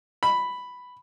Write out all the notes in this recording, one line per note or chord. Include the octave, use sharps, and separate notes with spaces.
B5